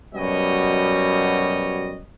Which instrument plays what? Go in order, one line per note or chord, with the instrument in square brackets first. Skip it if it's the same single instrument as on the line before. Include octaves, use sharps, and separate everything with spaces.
[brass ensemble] F#2 B2 G3 C#5 D#5